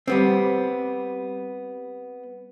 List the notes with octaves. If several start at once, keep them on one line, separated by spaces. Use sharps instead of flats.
G3 B3 C4